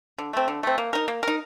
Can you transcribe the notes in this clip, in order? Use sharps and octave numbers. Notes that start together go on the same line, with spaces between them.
D3
A3 C4
D3
A3 C4
A#3
D#4 A#4
A#3
D#4 A#4